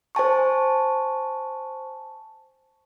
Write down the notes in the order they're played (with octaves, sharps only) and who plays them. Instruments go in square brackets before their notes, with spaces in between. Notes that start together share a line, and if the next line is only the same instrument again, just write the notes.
[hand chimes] C5 G#5 A5 C#6